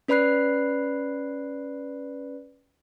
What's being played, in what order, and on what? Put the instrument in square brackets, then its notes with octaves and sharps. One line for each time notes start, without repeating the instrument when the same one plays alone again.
[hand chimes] C#4 B4 D5 B5 F#6 C7